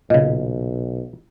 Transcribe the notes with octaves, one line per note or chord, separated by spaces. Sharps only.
B1 A#2 C#3 D#5